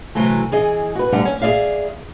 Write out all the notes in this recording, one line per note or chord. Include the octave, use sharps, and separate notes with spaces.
C3 E3 F#3 A3
E3 G#4 D#5
F#4 B4
F#2 D3 G3 A3 F#5
C#4
G#4 A4 D5 E5 F5